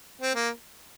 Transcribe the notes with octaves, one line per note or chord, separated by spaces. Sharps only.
C4
A#3